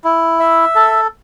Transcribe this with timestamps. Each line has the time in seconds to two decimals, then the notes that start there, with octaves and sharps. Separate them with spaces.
0.04 E4
0.40 E5
0.76 A4